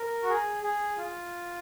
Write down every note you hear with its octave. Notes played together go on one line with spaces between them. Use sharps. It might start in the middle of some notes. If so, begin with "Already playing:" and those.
Already playing: A#4
F#4
G#4
G#4
F4